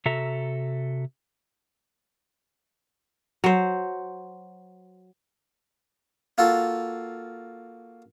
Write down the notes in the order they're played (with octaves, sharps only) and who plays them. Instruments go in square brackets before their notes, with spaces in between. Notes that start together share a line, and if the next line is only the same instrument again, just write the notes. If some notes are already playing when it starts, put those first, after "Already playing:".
[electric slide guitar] C3 F#4 A4 E5 A#5
[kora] F#3 C5
[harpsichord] A#3 F4 F#4 A4